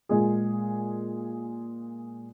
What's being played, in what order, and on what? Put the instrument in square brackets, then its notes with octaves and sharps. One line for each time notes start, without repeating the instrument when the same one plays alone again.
[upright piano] A#2 G#3 G#4